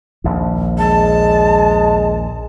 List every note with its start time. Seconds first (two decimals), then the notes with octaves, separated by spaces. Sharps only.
0.24 A#1 D#2
0.78 G#3 A5